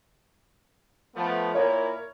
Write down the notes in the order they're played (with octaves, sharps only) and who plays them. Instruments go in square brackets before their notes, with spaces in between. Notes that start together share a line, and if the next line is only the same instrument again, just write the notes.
[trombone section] F3 A3 B3
[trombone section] A#2 E4 A#4 [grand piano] C#5